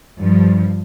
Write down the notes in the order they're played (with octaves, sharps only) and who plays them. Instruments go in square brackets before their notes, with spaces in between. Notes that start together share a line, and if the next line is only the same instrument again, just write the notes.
[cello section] G2 F3